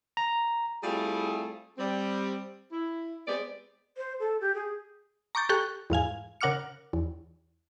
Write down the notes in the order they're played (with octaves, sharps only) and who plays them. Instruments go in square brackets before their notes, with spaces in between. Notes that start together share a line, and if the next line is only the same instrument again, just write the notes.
[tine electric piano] A#5
[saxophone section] G3 A3 C4 E4 F4 G#4
G3 C4
E4
G#3 B3 C4 G4 D5
[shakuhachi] C5
A4
G4
G#4
[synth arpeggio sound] A#5 C#6 D6 G6 A6
G4 A4 G5 C#6 F#6
E2 G#2 F5 G#5
C#3 A#4 F#5 D6 F6 C#7
E2